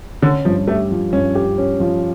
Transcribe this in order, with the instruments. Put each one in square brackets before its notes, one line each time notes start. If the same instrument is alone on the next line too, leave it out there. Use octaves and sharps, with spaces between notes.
[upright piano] D3 [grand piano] C#4
[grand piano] G2 [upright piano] F3
[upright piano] A3 [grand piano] G4
[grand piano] F3
[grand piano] G2 [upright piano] C#4
[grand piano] G4
C#4
F3